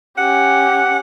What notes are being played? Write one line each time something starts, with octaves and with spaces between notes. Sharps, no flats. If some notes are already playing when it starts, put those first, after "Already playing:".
C#4 G4 F#5